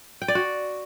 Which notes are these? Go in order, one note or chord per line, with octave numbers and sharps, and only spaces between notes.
G5
D5
F#4